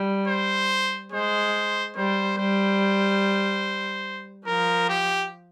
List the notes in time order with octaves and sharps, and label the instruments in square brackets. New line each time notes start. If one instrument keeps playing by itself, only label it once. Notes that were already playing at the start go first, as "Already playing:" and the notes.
Already playing: [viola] G3
[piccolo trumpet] C5
[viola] G#3 [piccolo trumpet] C5
[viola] G3 [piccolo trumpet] C5
[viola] G3 [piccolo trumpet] C5
[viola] F3 [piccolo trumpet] A#4
[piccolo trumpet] G4